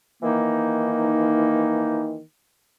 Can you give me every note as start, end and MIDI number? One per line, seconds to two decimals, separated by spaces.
0.23 2.22 51
0.23 2.22 52
0.23 2.22 58
0.23 2.22 63